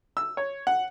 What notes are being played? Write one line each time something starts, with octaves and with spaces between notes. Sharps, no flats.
E6
C#5
F#5